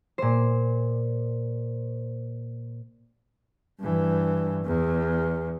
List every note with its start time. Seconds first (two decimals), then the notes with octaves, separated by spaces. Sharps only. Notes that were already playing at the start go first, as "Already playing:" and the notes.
0.18 A#2 C5
3.79 G2 E3
4.65 E2